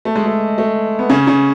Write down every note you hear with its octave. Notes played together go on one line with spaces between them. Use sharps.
A3
G#3
A3
A3
B3
C#3 C#4
C#3 C#4